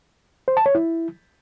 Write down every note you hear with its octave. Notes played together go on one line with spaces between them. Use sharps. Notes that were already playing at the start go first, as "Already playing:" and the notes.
C5
A5
C#5
E4